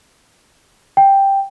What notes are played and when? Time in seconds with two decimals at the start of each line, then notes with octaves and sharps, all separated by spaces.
0.97 G5